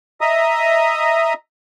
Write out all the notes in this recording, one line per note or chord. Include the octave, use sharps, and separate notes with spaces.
D#5 E5 A#5 D#6